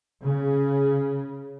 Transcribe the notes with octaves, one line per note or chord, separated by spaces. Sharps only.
C#3